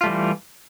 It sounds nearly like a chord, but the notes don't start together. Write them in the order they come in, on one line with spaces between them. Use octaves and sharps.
F4 A3 G3 E3